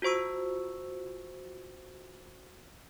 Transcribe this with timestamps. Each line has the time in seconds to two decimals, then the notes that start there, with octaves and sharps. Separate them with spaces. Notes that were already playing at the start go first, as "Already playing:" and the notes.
0.02 F4 F#4 C5 C#6 E6